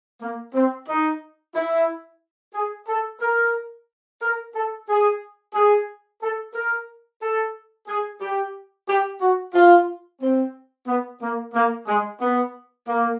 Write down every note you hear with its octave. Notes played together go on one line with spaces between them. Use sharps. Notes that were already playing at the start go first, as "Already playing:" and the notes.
A#3
C4
D#4
E4
G#4
A4
A#4
A#4
A4
G#4
G#4
A4
A#4
A4
G#4
G4
G4
F#4
F4
C4
B3
A#3
A#3
G#3
B3
A#3